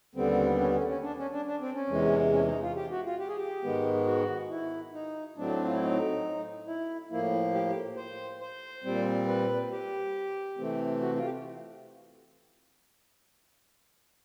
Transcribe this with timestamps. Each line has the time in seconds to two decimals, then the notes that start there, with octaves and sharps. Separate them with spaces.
0.15 D#2 D3 G3 B3 C4
0.59 C#4
0.73 C#4
0.87 C#4
1.02 D4
1.17 C#4
1.31 D4
1.46 D4
1.60 C4
1.75 C#4
1.89 E2 C3 E3 G#3
2.32 C#4
2.47 D#4
2.62 F4
2.76 G4
2.90 F#4
3.05 F4
3.19 G4
3.28 G#4
3.37 G4
3.63 G#2 D#3 G#3 B3
4.06 F#4
4.50 E4
4.93 D#4
5.37 A2 F#3 A3 C4 D4
5.65 F4
5.72 E4
5.80 D#4
6.67 E4
7.10 A2 F3 A#3 E4
7.54 G4
7.68 G4
7.97 C5
8.41 C5
8.84 A#2 G3 C4
9.28 B4
9.71 G4
10.57 C3 E3 A3 C4
11.01 F#4
11.16 F4
11.24 G4